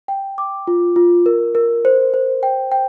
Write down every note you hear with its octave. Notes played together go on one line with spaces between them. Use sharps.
G5
D6
F4
F4
A#4
A#4
C5
C5
G5
G5